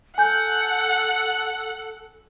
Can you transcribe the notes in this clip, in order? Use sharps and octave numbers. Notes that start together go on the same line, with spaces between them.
A4 F#5 G#5 G6